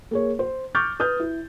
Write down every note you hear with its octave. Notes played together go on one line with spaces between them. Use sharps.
A#3 G#4 C#5
C5
C#6 D6 F6 G6 A6
B4 D#6 F6 G6
E4